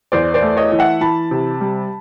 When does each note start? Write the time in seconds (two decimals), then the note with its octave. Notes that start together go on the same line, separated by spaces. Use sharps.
0.12 E2 C5 D5
0.34 C5 D5
0.42 A3
0.57 C#5 D#5
0.72 E3
0.79 E5 F#5
1.01 E3 A5 B5
1.31 C3
1.61 G3